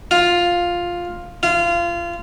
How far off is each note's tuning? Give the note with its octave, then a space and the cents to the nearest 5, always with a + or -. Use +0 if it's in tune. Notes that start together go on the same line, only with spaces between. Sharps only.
F4 +5
F4 -25